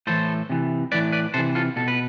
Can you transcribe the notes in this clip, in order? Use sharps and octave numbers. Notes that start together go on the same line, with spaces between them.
A2 E3 A4 C5
C3 E3
A2 E3 B4 D5
B4 D5
C3 E3 A4 C5
F4 A4
B2 A4
B4